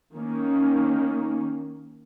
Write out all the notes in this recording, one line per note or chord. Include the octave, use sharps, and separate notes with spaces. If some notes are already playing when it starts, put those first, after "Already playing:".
D#3 A#3 C#4